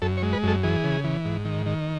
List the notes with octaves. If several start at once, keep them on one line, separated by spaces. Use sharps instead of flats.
F#2 A4
C#5
G#3
B4
F#2 A4
E3 G#4
C#3
E3
G#2
D#3
D#3